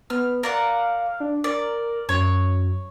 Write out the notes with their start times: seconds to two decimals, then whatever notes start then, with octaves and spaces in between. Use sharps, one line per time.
0.10 B3 F6
0.43 A#4 D5 F5 F#5
1.20 D4
1.44 A#4 D5
2.09 F#2 C#5